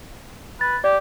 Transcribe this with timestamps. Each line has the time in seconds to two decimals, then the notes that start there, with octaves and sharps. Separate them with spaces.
0.61 B4 A6
0.84 G4 D5